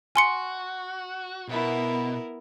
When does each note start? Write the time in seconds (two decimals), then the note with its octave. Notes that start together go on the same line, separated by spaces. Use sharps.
0.16 F#4 G#5 C6 C#7
1.48 B2 B3 E4 A#4